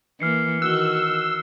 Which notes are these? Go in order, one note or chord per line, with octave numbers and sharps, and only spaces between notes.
E3 A#3 F6 C7 C#7
D#3 F#4 E6 F#6 E7 G7